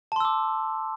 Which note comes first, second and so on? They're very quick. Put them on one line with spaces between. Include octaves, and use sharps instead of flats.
A5 C6 E6 D6